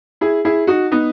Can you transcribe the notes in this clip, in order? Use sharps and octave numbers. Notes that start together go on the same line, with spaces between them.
E4 G#4
E4 G#4
D#4 F#4
B3 D#4